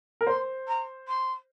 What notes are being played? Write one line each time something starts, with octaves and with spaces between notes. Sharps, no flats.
A#4
C5 C6
A#5
C6